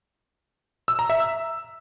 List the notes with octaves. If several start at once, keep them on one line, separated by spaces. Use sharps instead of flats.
E6
A#5
E5
E6